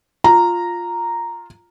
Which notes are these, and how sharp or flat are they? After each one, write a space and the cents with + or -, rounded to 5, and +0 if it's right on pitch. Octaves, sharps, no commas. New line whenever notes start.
F4 +5 A#5 -5